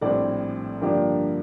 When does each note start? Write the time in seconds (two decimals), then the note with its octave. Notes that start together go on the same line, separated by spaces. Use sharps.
0.01 A#1 A2 G3 C4 D5
0.81 G2 D3 F3 A#3 D4 G4